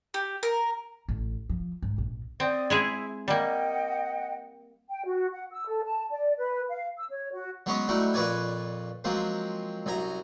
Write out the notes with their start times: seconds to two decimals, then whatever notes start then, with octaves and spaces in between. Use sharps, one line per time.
0.14 G4
0.43 A#4
1.08 A1
1.49 F3
1.82 G#2
1.98 A#1
2.40 C4 D5 E5 D#6
2.70 G#3 E4 G#4 E5
3.28 G3 A#3 D#5 F#5 G5
4.90 G5
5.05 F#4
5.32 F#5
5.51 E6
5.68 A4
5.84 A5
6.11 D5
6.37 B4
6.69 F5
6.97 E6
7.10 C#5
7.33 F#4
7.66 F#3 G#3 B3 C#4 C#5 D#5
7.88 F#3 G3 A3 D#4 E4
8.14 F2 A#2 B4 C#5 D5 G#5
9.04 F3 F#3 G#3 A#3 C4
9.86 C2 F#2 G#5 A#5